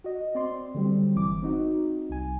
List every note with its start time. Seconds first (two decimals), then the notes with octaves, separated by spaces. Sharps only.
0.04 F#4 D#5
0.35 C4 D5 C6
0.75 D3 F#3 G3 C4
1.16 G1 E3 D6
1.42 C4 D#4 F#4
2.09 C2 G#5